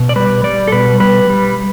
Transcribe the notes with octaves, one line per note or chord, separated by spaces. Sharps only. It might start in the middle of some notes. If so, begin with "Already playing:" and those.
Already playing: B2
D5
G3 B4
G3 D5
A4
B2 B4
G3 B4
G3